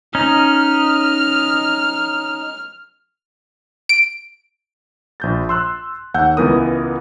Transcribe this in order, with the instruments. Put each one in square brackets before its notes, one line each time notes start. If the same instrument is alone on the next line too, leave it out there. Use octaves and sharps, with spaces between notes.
[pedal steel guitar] C#4 D#4 [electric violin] F6
[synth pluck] D7
[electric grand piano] A#1 G6 A6
C6 E6 F#6
D#2 F#5 E6 G6
C#2 E3 B3 A#4 D#6